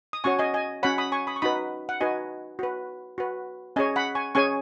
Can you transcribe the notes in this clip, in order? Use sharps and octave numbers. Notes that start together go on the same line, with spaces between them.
D#6
C#4 F#4 C#5 G#5 C#6
D#5 G#5
D#5 G#5
C#4 F#4 C#5 F#5 B5
B5 D#6
G#5 C#6
B5 D#6
C#6
D#4 F#4 B4 B5 D#6
F#5
D#4 F#4 B4 D#5 G#5
F#4 B4
F#4 B4
C#4 G#4 C#5 D#5 G#5
F#5 B5
G#5 C#6
C#4 G#4 C#5 G#5 C#6